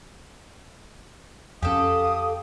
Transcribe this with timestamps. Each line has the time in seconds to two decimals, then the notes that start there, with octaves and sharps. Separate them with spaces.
1.62 F2 C#4 G4 A4 F5 D#6